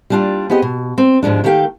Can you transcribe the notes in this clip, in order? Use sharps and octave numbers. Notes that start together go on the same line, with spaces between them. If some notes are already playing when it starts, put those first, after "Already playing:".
G3 A#3 D4 D#4 F4
B3 C4 G4 G#4 D#5
B2
C4
D#2 G#2 F3 G#3 D4
D#3 A3 A#3 G4 F5 G5